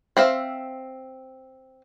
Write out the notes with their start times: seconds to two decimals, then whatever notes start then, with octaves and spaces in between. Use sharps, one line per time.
0.17 C4 E5 F5